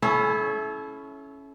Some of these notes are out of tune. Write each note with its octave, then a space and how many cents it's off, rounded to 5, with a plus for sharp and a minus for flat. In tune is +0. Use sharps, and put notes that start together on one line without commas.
C#4 +0 E4 +0 A4 -40